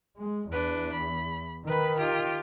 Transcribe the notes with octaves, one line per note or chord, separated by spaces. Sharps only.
G#3
E2 D4 B4
B5
D#3 B4 B5
F4 G4